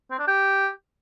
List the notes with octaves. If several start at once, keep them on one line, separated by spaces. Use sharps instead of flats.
C4
D4
G4